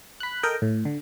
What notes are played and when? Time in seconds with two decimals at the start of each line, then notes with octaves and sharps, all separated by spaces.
0.20 B5 F#6
0.43 A4 A#4 D#5 G5
0.62 A2
0.85 D3